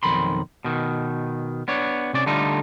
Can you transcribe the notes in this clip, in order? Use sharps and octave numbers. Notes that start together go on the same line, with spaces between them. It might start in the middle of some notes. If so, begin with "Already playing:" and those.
B1 F2 D#3 B5 C6
B2 D#3
B3 D4 C#5
C3 C#4 D5
D3 G3 A3 D4 D#4 F4